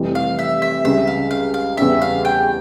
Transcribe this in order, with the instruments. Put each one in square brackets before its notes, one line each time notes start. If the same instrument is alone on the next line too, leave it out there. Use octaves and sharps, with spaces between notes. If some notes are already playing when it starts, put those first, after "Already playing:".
Already playing: [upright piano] F1 F2 E3 G3
[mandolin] F5
E5
E5
[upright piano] C#2 C#3 G3 [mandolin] E5
[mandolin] F5
F5
F5
[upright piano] E2 C#3 G3 C#4 G4 [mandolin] E5
[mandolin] F5
G5